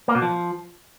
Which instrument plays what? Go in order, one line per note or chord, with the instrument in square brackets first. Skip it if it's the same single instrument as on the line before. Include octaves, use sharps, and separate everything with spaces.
[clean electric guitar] A#3
B2
F3